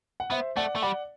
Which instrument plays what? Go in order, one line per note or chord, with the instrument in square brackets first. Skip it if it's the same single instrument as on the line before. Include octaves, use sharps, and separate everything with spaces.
[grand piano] F#5
[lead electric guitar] B3 [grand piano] C5 E5
[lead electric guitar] A3 [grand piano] D5 F#5
[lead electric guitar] A3
[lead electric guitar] G3 [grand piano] D5 F#5